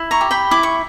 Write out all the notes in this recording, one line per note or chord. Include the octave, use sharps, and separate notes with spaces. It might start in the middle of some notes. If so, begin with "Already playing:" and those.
Already playing: E4
A#5 C#6
G4
G5 B5
E4 D6
C#6